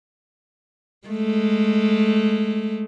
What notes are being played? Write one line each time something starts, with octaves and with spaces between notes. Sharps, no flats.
G#3 A3